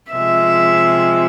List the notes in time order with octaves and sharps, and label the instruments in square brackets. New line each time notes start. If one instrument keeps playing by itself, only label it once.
[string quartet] C3 F3 G#3 [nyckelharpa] E5